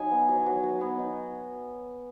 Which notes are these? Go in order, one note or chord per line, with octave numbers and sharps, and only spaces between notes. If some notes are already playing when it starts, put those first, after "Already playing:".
Already playing: F#3 D#4 G#5
B3
F#3
F#3
F#3
B3
D#4